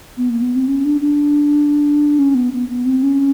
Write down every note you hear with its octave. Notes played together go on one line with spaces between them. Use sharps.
B3
A#3
B3
C4
C#4
D4
D4
C#4
B3
B3
B3
C4
C#4